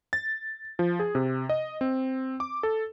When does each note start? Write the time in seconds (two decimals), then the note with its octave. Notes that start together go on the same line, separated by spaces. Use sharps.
0.13 A6
0.79 F3
1.00 G#4
1.15 C3
1.49 D#5
1.81 C4
2.40 D6
2.63 A4